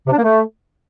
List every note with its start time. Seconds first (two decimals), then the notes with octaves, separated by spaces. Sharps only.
0.07 C3
0.12 D4
0.18 A#3
0.23 A3